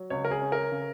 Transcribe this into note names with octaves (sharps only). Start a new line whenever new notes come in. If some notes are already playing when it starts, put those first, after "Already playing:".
Already playing: F#3
C#2 C#5
A#4
G#4
C#4
A#4
C#3